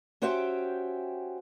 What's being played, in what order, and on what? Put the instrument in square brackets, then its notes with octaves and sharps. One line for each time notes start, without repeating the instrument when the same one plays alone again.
[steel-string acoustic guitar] C#4 F#4 G4 C5 E5 G5